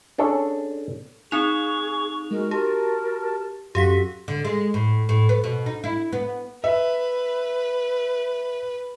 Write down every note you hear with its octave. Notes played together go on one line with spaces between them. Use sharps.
C#4 D4 G#4 A4 C#5
C4 D#4 G#4 C#6 F7
G#3 F#4 A#4
G4 A#4 A5
F#2 F#4 G4 A4 F5 B6
D3
G#3
A2
A2
B3
B2
D#4
E4
B3
B4 E5